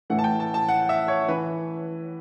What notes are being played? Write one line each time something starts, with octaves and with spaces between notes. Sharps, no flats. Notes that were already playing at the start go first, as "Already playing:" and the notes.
A2 E3 A3 F#5
A5
G5
A5
A5
F#5
E5
C#5
E3 B4